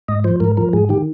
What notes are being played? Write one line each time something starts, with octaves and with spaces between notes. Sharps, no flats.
G#2 D#5
F3 C5
G#2 A#4
F3 A#4
G#2 G#4
D#3 G4